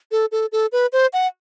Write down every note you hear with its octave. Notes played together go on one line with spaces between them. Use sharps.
A4
A4
A4
B4
C5
F#5